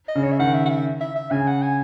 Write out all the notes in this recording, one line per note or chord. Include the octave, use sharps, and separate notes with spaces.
D#5
C#3
C#5
E5
D#3 F#5
E5
F#5
E5
E5
E5
C#3 G#5
F#5
G#5